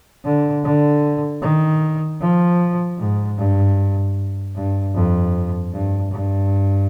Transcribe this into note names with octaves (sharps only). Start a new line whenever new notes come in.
D3
D3
D#3
F3
G#2
G2
G2
F2
G2
G2